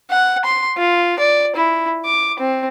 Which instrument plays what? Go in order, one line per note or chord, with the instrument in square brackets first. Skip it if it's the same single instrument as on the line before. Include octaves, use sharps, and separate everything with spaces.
[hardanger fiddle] F#5
C6
F4
D5
E4
D6
C4